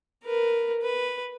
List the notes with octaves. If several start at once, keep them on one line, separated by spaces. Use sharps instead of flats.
A#4 B4
B4